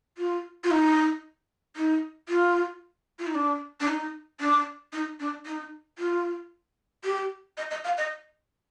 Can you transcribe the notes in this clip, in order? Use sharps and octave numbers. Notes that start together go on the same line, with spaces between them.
F4
F4
D#4
D#4
F4
F4
D#4
D4
D4
D#4
D4
D#4
D4
D#4
F4
G4
D#5
D#5
F5
D#5